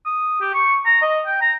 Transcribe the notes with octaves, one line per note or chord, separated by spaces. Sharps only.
D#6
G4
C#6
A#5
D#5
G5
A#5